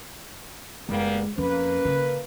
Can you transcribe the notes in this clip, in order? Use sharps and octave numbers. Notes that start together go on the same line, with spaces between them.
F#1 G3 G#3 A#3 B3
F2 A#3 C#4 B4
C#3